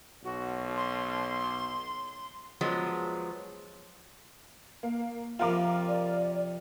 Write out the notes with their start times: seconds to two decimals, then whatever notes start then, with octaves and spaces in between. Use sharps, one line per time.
0.24 B1 F#4
0.77 C6
2.61 F3 F#3 G#3 B3
4.83 A#3
5.39 F2 C3 F4 A#4 D6
5.88 D5